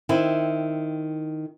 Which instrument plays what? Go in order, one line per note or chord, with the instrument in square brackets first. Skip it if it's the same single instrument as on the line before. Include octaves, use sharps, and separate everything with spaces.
[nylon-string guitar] D#3 C4 E4